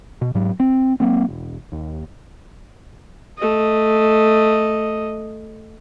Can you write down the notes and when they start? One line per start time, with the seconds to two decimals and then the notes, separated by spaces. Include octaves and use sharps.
0.21 B2
0.35 G#2 F#3
0.60 C4
1.00 F#3 A#3 C4
1.29 E1
1.72 D#2
3.38 A3 D#5